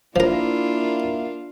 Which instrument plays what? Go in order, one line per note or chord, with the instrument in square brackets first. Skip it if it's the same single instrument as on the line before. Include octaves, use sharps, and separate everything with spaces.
[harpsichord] F3 A#4 [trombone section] A#3 E4 [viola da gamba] D4 F4